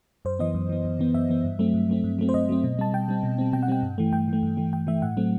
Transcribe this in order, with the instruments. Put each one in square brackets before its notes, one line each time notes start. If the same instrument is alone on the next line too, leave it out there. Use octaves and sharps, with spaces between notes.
[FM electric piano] F#2 C5
E3 B3 D#5
F#2
E3 B3
F#2
E3 B3
F#2 E5
E3 B3
G2
F#3 A3 C4
G2
F#3 A3 C4
G2
F#3 A3 C4
C5
G2 D#5
F#3 A3 C4
B2
G3 C4 A5
B2 G5
G3 C4
B2
G3 C4
B2 G5
F#5
G3 C4 G5
G2
E3 A3
G2 G5
E3 A3
G2
E3 A3
G2 G5
E3 A3 E5
A2 F#5
F#3 A3 C4